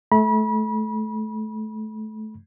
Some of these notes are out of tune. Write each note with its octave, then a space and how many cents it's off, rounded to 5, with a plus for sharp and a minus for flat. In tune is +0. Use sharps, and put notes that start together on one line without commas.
A3 -25 B5 -35